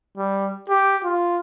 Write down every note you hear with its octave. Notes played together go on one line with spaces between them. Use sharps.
G3
G4
F4